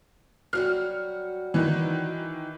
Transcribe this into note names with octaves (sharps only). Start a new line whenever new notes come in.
F#3 G3 F#4 F6
D#3 E3